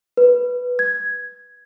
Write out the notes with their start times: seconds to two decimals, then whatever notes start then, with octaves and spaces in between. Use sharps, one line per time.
0.17 B4
0.79 G#6